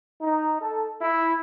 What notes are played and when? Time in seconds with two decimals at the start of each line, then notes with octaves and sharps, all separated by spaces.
0.22 D#4
0.60 A4
1.01 E4